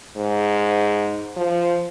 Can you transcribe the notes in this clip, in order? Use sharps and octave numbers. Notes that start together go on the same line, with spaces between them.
G#2
F3